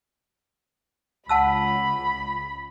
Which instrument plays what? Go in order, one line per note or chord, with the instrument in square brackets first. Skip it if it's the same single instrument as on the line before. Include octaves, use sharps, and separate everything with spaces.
[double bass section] C#2 [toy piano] F#5 A5 E6 [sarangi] B5